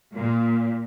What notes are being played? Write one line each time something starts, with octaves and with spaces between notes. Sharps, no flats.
A#2